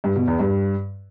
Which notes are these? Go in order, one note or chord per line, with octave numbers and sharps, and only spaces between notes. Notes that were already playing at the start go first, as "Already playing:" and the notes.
G2
B2
E2
G2